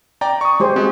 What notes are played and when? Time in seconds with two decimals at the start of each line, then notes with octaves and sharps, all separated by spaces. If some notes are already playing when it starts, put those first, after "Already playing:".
0.21 D5 G5 A#5
0.41 C#6 D#6
0.60 G#3 G4 C5
0.76 G#3 C4 F#4